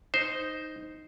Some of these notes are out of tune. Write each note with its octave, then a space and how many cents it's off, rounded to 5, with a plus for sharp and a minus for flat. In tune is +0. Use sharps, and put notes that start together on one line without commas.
D#4 +0 C5 +0